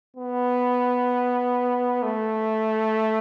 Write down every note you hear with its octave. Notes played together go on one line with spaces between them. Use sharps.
B3
A3